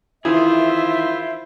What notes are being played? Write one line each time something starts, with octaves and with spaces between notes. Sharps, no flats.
D#3 E3 E4 F4 G#4 C5 E5